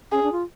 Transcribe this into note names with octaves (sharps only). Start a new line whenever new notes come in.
C#4 G#4
D4
F4